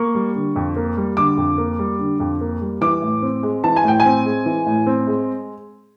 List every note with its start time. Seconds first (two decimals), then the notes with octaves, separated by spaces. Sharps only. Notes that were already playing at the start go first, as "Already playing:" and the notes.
Already playing: A#3 C#6
0.15 G3
0.35 D3
0.56 F2
0.76 A#3
0.97 G3
1.17 D3 D6
1.37 F2
1.58 A#3
1.79 G3
1.99 D3
2.20 F2
2.41 A#3
2.61 G3
2.81 E3 D6
3.02 A2
3.22 C4
3.43 G#3
3.64 E3 A5
3.76 G#5
3.84 A2 G5
4.00 G#5
4.05 C4
4.25 G#3
4.46 E3
4.66 A2
4.87 C4
5.07 G#3